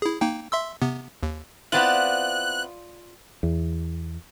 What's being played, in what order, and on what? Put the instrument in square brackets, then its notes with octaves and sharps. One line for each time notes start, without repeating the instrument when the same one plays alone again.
[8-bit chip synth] E4 G#4
A#3 D#4 G5
E5 C6 E6
C3 B3
D#2
[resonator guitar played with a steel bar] B3 C4 E4 [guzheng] F4 D5 [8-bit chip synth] F#6
[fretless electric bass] E2